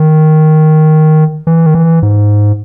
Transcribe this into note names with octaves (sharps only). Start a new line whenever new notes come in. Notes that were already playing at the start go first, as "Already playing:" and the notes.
Already playing: D#3
E3
D#3
E3
G#2